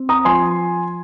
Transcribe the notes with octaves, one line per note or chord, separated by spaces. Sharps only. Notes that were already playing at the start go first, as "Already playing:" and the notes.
Already playing: C4
A#5 D#6
F3 G#5 C6